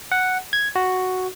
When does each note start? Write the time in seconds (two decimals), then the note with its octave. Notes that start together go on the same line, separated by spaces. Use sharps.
0.12 F#5
0.53 G#6
0.76 F#4